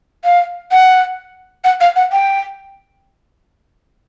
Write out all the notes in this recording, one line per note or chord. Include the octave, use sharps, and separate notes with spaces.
F5
F#5
F#5
F5
F#5
G5